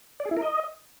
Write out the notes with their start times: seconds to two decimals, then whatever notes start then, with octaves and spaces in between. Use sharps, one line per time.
0.20 D5
0.25 G#4
0.31 E4
0.37 A#4
0.42 D#5